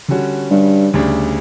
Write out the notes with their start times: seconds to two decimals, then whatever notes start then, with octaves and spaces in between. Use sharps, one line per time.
0.08 D3 G3 C#4 F#4
0.51 G2
0.94 D2 C#3 G3 D4